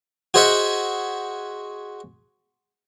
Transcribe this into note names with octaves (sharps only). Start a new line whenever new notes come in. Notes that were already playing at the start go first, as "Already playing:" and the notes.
F#4 G#4 C5 D#5 E5 F#5